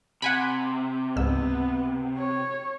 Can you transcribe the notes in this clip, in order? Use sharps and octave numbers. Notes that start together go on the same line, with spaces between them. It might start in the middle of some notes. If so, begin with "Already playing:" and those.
C3 F#5 G#5 B5 D7
C#2 G#2 B3 E6
C#5